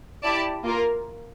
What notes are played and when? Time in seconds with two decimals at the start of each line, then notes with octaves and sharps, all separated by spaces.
0.23 E4 G4 D5 A5
0.64 A#3 F4 A#4